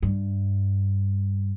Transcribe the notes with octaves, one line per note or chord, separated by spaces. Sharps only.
G2